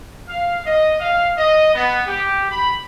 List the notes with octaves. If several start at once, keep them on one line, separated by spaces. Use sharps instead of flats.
F5
D#5
F5
D#5
B3
G4
B5